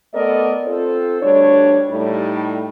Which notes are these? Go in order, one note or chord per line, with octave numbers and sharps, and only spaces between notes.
A3 B3 A4 A#4 D5 D#5
C4 F4 A4 C5
D2 G3 D4 C#5
A2 G3 D#4